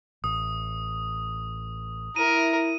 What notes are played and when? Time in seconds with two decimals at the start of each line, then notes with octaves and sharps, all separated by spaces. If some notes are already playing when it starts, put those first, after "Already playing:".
0.24 A1 D#6
2.16 E4 A#4 D#7